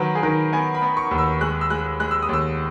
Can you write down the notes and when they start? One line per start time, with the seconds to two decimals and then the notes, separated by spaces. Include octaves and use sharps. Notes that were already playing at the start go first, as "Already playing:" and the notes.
Already playing: D#3 F#3 A#4 B4
0.15 G#4
0.23 D#3 A#4
0.53 B3 G#5
0.74 B5
0.82 B3
0.97 C#6
1.11 D#2
1.18 E6
1.41 G#3 F#6
1.61 E6
1.70 G#3 F#6
2.00 G#3 F#6
2.11 E6
2.22 D#6
2.29 D#2 E6